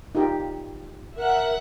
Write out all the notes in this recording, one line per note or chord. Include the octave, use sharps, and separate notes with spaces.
D#4 F4 G4
A#4 E5 F#5 F#6